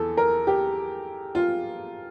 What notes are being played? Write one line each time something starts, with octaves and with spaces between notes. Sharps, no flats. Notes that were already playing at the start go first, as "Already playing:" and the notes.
Already playing: E2 E3 A4
A#4
G4
F4